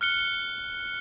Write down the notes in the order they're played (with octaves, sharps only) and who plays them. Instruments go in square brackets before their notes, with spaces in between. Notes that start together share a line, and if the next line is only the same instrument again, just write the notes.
[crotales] F6 F#6 C#7 G7